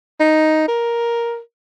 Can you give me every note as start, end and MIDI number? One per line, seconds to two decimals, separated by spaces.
0.20 0.66 63
0.68 1.39 70